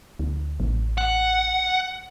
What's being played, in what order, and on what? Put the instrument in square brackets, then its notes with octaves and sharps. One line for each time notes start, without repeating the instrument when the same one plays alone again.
[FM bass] D2
A1
[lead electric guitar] F#5